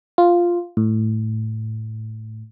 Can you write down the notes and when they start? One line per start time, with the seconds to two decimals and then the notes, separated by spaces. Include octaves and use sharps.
0.18 F4
0.77 A2